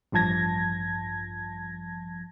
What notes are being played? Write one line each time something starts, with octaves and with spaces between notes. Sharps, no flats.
A1 G2 F3 A5 G#6 A#6